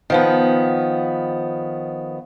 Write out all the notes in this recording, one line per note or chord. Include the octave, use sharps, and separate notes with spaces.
D#3 F3 B3